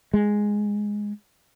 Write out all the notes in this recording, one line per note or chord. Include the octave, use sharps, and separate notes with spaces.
G#3